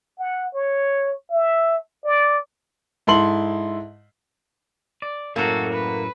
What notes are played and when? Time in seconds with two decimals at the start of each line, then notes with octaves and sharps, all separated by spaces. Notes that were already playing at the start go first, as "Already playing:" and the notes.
0.19 F#5
0.54 C#5
1.30 E5
2.05 D5
3.07 G#2 E4 A4 C6 F#7
5.02 D5
5.36 F#2 A2 A#3 F#4 A4 A#4
5.73 B4